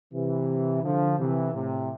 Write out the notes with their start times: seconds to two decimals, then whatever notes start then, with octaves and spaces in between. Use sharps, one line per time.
0.13 C3 E3
0.83 D3 F3
1.18 C3 E3
1.53 A2 C3